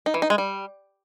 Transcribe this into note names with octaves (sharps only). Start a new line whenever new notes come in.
D#4
E3
D#4
G#3
G3